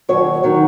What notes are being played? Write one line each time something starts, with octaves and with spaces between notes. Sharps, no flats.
D#2 D#3 F#3 C#5
D#3 F#3